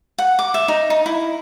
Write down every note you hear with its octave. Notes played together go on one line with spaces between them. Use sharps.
F#5
D6
E5
D#4
D#4
E4